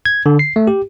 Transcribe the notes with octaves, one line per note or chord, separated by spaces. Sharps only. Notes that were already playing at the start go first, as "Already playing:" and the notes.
G#6
D3
C7
A3
G4